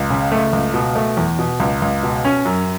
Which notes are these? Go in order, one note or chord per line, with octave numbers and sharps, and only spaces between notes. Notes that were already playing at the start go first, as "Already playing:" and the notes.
Already playing: C#2
C#3
A3
C#2
B2
A3
E2
B2
C#2
C#2
B2
C#4
F#2